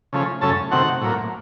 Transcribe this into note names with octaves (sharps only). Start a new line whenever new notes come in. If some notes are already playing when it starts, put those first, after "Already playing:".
C#3 F3 A3 C#4
F#2 C#3 A3 C#4 A4 A5
C3 D#3 A3 C4 F#4 F#5
A2 F#3 A#3